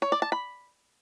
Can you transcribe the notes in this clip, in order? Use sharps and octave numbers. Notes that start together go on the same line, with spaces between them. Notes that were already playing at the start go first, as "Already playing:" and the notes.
C#5
D5
A5
B5